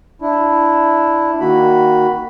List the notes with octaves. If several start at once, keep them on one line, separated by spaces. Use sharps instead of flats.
D4 E4
D#3 A#3 F#4 B5